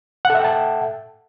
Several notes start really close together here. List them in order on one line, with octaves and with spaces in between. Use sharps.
F#5 A4 E5 G5 A5